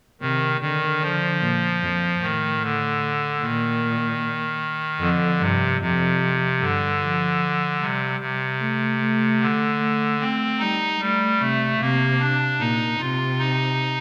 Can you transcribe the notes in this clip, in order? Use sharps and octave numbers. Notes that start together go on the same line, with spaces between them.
C3 D#3
D3 D#3
D3 F3
A#2
F2
A2 D#3
D3
A#2 D#3
F2 D3
G2 C3
F2 C3
G2 D3
F3
C3 G3
C3
A3
A3
D3
A3
A3 C4
G3 D#4
G3 A3
C3 A3
C3 A#3
D4
A#2 D#4
C3 F4
D#4